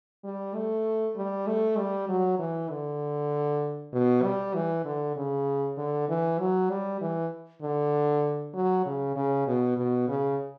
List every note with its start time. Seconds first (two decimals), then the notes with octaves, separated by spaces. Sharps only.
0.24 G3
0.55 A3
1.16 G3
1.47 A3
1.78 G3
2.09 F#3
2.39 E3
2.70 D3
3.93 B2
4.24 G3
4.54 E3
4.85 D3
5.16 C#3
5.77 D3
6.09 E3
6.39 F#3
6.70 G3
7.01 E3
7.62 D3
8.54 F#3
8.85 C#3
9.16 C#3
9.47 B2
9.77 B2
10.08 C#3